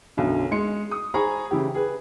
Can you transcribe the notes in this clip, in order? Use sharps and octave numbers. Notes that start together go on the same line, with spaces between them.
B1 F#2 D3
G#3 C6 C#7
D#6
G#4 C5 G#5 A#5 B5 C#6
C#3 E3 E4 G4
G#4 B4